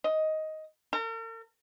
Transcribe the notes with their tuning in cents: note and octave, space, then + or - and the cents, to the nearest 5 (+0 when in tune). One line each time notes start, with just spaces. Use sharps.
D#5 +10
A#4 -45